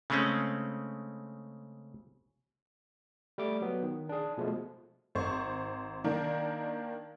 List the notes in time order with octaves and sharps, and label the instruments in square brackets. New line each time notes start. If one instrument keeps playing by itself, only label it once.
[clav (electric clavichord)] C#3 G#3 A3 C4 C#4
[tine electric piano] G3 A3 D6
F#3 B3
D#3
D4 G#4
B2 F3 G#3 A3
[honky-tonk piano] G#1 C5 C#6
D#3 A#3 D4 A#4